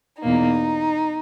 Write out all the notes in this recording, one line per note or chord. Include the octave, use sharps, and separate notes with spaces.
E2 B2 A#3 D#4